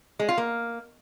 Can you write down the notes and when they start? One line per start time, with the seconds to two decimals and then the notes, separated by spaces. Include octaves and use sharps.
0.19 G#3
0.29 F4
0.38 A#3